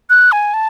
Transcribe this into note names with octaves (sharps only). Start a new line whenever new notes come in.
F#6
G#5
A5